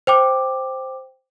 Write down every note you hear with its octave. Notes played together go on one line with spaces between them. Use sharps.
C5 G5 D6